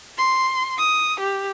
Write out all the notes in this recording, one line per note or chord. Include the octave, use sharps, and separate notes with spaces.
C6
D#6
G4